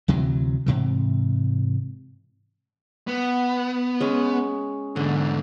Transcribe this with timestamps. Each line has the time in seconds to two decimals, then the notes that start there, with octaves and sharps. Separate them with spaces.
0.08 D2 C3 E3 F#3
0.66 G#2 C3 E3
3.07 B3
4.00 G#3 C#4
4.96 E2 G#2 D3